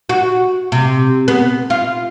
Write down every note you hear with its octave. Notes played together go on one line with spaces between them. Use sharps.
F#4
C3
B3
F4